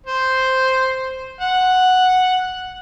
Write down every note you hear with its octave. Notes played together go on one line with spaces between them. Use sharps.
C5
F#5